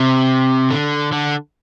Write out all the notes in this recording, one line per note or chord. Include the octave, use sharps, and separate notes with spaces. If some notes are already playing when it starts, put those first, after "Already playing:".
Already playing: C3
D3
D3